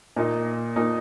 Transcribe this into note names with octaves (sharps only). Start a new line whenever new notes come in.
A#2 A#3 D#4
A#2 A#3 D#4